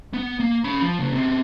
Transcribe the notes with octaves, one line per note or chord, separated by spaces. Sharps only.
B3
A#3
C#4 B5
F3
C#3 A#3
B2 C4